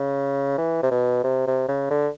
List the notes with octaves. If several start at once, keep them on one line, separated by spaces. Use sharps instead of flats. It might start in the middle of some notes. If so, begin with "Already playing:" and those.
Already playing: C#3
E3
C3
B2
C3
C3
C#3
D3